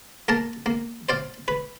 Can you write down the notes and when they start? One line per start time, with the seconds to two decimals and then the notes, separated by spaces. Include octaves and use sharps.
0.28 A#3 A#4 A5
0.66 A#3
1.09 C5 D5 F5
1.48 B4